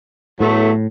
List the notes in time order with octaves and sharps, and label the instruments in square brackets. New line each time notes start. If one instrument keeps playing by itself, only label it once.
[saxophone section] E2 F#3 A3 [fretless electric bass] A2